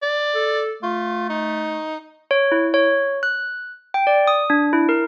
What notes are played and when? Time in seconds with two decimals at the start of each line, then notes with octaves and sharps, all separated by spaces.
0.02 D5
0.35 A4
0.83 A3 F4
1.30 D#4
2.31 C#5
2.52 E4
2.74 C#5
3.23 F#6
3.94 G5
4.07 D5
4.27 D#6
4.50 D4
4.73 E4
4.89 A#4